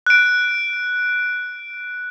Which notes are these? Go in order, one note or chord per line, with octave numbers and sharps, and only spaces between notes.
F#6 D7